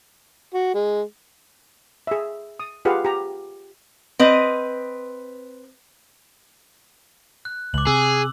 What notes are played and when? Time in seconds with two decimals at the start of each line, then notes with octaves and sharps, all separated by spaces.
0.54 F#4
0.74 G#3
2.07 G#4 E5
2.60 D#6
2.85 F4 G4 G#4 B4 F5 F#5
3.05 G4 A#5
4.19 C4 B4 D#5
7.45 F#6
7.74 C#2 D6 F#7
7.87 C3 G#4 E6